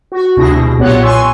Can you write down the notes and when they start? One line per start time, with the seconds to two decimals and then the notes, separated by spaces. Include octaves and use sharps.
0.12 F#4
0.37 D2 C3 D4 E4 G#4 A#6
0.52 B2
0.78 B1 A#2 B3 G4 C#5 F#6
1.03 G#5 C6 C#6 E6